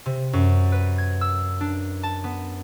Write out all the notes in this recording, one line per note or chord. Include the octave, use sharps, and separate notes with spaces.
C3
F#2
B4
G#6
E6
D4
A5
B3